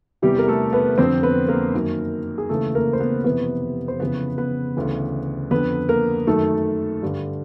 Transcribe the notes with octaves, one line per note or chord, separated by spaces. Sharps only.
E2 C3 E3 G3 G4
A#4
A3 A4
B3 B4
F2 D3 C4 C5
B3 B4
A#3 A#4
F#2 D#3
G#4
D#2 C#3 E3 A3 A4
A#3 A#4
C5
B3 B4
F2 C3 E3 B3 B4
C5
F2 C#3 E3 B3 B4
B3 B4
D2 C#3 E3
F2 D3 B3 B4
A#3 A#4
F#2 D#3 A3 A4
G2 D3